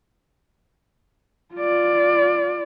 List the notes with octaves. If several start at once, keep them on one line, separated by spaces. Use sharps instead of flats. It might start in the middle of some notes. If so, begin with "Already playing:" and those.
F4 D5